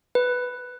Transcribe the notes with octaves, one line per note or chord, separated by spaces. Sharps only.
B4